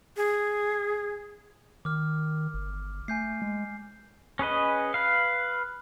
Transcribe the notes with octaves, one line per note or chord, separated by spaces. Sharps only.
G#4
D#3 D6 F6
G1
A3 G#5 G6 C7
G#3
C#4 G#4 B4 D#5
B4 F5